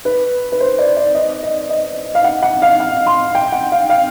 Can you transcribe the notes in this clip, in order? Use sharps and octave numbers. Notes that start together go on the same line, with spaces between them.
B4
B4
C5
D5
D5
D#5
D#5
D#5
F5
F#5
F#5
F5
F#5
C6
G5
F#5
F5
F5